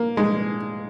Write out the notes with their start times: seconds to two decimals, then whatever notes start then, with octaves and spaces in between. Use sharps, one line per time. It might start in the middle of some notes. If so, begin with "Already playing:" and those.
Already playing: A#3
0.17 G#3